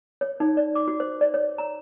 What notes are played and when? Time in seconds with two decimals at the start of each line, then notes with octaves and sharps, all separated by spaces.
0.21 C#5
0.40 D#4
0.57 D5
0.75 D6
0.88 F#4
1.00 C5
1.21 D5
1.34 C#5
1.58 A#5